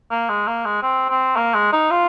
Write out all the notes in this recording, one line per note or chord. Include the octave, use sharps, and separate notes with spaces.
A#3
G#3
A#3
G#3
C4
C4
A#3
G#3
D#4
F4